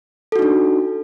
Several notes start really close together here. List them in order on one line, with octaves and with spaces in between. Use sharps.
A4 F#4 D#4 D4